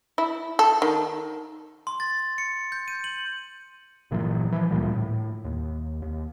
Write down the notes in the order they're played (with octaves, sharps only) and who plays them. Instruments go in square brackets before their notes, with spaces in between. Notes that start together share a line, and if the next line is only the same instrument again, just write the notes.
[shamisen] E4
A4
D#3
[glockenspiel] C6
A6
C#7
G6
D#7
F#7
[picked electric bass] G1 A#2 E3 F#3
E3 F3
D2 A#2 G3
A2
D#2
D#2